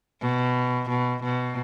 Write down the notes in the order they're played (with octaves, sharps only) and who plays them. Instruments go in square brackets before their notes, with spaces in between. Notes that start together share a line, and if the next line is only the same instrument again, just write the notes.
[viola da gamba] B2
B2
B2